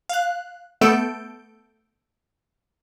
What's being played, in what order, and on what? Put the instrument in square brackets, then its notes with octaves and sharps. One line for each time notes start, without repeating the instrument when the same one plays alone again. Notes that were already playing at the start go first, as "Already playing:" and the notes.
[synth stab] F5 F#6
A3 B3 A4 G6 D7